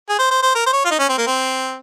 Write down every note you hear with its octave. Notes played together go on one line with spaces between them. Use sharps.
G#4
C5
C5
C5
A#4
C5
C#5
F4
D#4
C#4
C4
A#3
C4